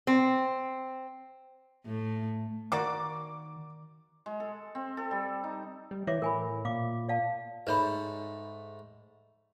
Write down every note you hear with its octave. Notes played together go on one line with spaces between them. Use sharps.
C4
A2 A3
D#3 A#3 F#4 D5 D6
G#3
A4
C4
A4
G3
D#4
G3
E3 C#5 E5 D6
A2 A#4 G#5 B5
A#2 F5 D6
D5 F5 A5
G#2 A3 B4 C#5 B5